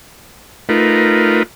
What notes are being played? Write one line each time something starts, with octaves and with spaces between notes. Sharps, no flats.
A3 D#4 F4 A#4 B4